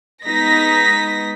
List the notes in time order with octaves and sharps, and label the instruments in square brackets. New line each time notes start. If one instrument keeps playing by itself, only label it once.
[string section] G#3 B3 D#4 A#6 B6